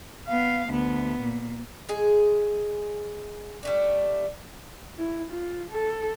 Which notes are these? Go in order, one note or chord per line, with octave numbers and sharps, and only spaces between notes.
B3 F5
D2 B3
A#2
G#3 G#4
G3 A3 D4
E4
F4
A4